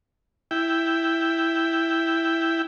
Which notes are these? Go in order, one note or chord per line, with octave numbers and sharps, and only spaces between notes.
E4 G5